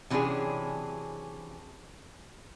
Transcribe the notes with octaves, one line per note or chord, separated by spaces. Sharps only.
C3 E3 F#3 C#4 D4 G#4